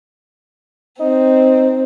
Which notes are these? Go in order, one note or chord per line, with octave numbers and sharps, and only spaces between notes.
C4 D#4